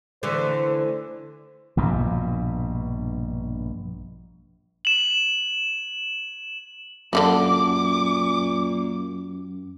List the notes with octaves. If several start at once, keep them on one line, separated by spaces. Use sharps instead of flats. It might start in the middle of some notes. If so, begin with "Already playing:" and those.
D3 E3 A3 C5
A#1 G2 B2
E7 F#7
F#2 A#2 D3 D#3 G3 D6